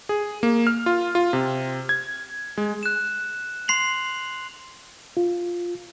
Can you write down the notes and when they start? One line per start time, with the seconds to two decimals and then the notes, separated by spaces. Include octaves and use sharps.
0.09 G#4
0.43 A#3
0.67 F6
0.86 F4
1.15 F4
1.33 C3
1.89 G#6
2.58 G#3
2.83 F#6 E7
3.68 C6 C7 F7 F#7
5.17 F4